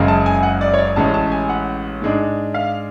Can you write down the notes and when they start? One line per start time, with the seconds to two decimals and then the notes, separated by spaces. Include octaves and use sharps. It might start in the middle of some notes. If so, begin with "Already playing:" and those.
Already playing: F#1 F#2 C#3 G#3
0.08 A5
0.26 G#5
0.43 F#5
0.61 D5
0.74 C#5
0.79 D5
0.96 A1 A2 G#3 C#4 A5
1.14 A5
1.32 G#5
1.49 F#5
2.02 G#2 G#3 D4
2.54 F5